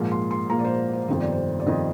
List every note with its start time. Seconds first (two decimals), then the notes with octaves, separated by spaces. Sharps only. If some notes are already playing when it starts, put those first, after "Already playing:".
Already playing: A#1 G#2 F3 A#3
0.12 C6
0.31 C6
0.50 A#1 G#2 F3 A#3 A#5
0.59 D5
0.65 C5
0.93 C5
1.08 G1 F2 C3 D#3 C5
1.20 D5
1.32 C5
1.60 D5
1.66 F2 C3 D#3 D#5